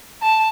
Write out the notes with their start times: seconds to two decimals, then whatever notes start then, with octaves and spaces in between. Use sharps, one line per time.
0.23 A5